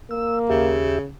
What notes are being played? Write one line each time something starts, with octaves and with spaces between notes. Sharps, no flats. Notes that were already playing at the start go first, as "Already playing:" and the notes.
A#3 E6
D#2 C#3 G4 E5